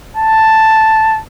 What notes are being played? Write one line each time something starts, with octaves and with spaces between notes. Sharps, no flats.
A5